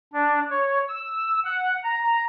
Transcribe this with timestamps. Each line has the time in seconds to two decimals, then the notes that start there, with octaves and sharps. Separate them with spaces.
0.13 D4
0.50 C#5
0.88 E6
1.45 F#5
1.84 A#5